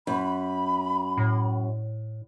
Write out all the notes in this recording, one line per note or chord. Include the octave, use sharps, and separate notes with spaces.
F#2 B5
A2